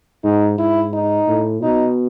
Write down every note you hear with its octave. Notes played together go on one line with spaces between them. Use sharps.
G#2 D#4
G#2 E4
D#4
A2
B2 D#4